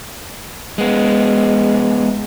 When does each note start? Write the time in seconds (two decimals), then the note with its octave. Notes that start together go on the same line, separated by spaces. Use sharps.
0.78 G#3 B3